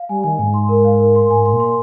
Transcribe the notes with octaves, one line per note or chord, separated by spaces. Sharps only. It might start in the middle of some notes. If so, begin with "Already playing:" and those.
Already playing: F5
G3 G#5
D#3 G#5
G#2 G#5
C6
A#4
F5
A#4
C6
G#2 G#5
G#2 C6
A#2
C6